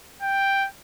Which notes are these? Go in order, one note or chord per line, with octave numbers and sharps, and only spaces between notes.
G5